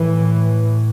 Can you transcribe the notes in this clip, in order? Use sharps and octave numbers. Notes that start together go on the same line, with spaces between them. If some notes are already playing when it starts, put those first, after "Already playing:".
Already playing: A2 E3